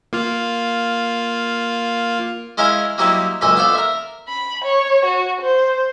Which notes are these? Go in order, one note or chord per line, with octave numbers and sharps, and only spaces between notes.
A#3 F4 F6
G#3 C#4 E4 A#4 D#5 F5
F#3 G3 A#3 C4 D#4 E4
C#2 F#2 A#2 D4 A4 D#5
B3 D4 A4 C5 D5 F5
A#4 E5
B5
C#5
F#4
C5